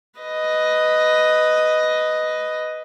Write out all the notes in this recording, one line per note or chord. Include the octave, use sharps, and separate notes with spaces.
B4 D#5